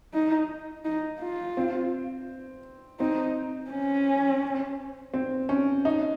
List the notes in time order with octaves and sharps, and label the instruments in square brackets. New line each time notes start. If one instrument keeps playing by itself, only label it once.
[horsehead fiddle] D#4
D#4
F4
[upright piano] C4
[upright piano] C4 [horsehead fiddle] D#4
[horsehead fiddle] C#4
[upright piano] C4
C#4
D#4